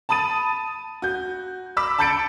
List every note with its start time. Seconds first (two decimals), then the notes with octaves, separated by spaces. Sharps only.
0.09 A5 B5 D#6 A6 D#7
1.02 F#4 G6
1.77 B5 D6 E6 B6
1.99 A5 B5 G6 A6 C#7 D7